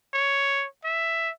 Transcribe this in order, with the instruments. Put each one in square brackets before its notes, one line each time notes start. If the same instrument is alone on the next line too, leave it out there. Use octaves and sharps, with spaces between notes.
[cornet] C#5
E5